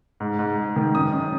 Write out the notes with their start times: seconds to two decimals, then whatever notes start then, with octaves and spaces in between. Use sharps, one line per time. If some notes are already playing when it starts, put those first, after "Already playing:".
0.20 G#2
0.39 G#2
0.58 G#2
0.76 D#3
0.94 F#2 D#6
1.12 F#2